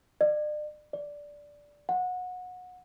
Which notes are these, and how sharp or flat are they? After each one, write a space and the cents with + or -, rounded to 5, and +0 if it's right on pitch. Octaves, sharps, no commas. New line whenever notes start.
D5 +40
D5 -5
F#5 -25